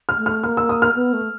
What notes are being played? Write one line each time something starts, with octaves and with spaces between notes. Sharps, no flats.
F6
A3
F6
A#3 F6
E6
D#6
F6
B3
A3